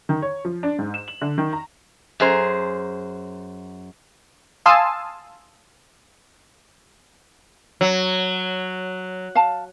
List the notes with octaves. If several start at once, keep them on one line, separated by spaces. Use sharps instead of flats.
D#3
C#5
F3
D4
G#2
E7
F#7
D3
D#3
A#5
F#2 G#4 C5 A#5
F5 G#5 A5 C6 D#6 E6
F#3
F5 A5